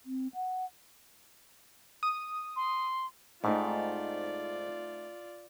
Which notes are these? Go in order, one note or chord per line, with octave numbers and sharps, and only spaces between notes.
C4
F#5
D#6
C6
G#2 A3 C4 D#4 F4 D5